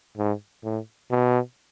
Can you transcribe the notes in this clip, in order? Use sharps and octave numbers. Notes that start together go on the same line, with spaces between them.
G#2
A2
B2